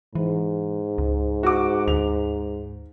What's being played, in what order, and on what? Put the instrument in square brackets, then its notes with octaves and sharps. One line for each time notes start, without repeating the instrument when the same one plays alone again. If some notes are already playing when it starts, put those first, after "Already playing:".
[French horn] G#2 [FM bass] E3
[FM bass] C#2
[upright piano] F#4 D6
[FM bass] D2 [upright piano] F7